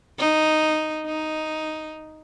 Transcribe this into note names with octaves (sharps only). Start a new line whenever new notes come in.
D#4
D#4